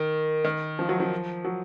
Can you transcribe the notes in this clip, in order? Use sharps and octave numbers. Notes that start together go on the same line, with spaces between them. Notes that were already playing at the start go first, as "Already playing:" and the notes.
Already playing: D#3
D#3
F3
F#3
F3
F#3